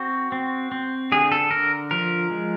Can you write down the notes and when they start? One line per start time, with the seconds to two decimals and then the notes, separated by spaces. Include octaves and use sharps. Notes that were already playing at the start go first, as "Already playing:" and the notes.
Already playing: C4 F#4
0.32 C4
0.72 C4
1.12 D3 G#4
1.32 A4
1.51 D3 A#4
1.91 F3 A#4
2.30 G#3